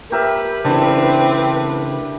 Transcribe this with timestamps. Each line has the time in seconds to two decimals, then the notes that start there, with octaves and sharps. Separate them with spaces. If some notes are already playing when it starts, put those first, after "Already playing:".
0.12 G4 A#4 B4 E5
0.65 C#3 E3 A3 C4 D4